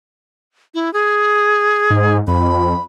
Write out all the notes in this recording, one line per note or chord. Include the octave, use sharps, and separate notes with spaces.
E4
G#4
G#2
F2 B5